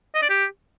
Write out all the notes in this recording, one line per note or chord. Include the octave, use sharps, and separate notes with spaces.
D#5
D5
G4